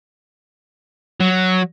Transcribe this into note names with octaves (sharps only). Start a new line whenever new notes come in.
F#3